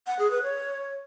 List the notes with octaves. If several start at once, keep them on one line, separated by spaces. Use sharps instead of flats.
F#5
G#4
B4
C#5